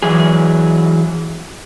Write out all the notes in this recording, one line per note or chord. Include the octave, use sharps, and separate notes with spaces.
E3 F#3 G#4